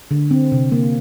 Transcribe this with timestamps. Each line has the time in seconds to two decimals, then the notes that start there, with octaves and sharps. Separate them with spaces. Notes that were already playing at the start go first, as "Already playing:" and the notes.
0.11 D3
0.31 C4
0.52 C3
0.72 A#3